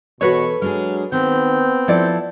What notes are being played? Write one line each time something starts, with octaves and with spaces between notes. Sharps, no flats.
E2 B2 F#4 A4 B4 C#5 C#6
F#3 G#3 D4 G#4 F6
D#3 B3 C4 G6
F3 E4 A4 D5